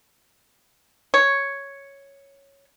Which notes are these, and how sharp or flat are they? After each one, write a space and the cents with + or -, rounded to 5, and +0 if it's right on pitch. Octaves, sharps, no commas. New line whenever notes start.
C#5 +0